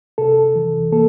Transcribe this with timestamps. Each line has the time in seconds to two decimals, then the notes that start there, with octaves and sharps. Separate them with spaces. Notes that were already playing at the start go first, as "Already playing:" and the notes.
0.18 C3 A4
0.56 E3
0.92 A#3 A4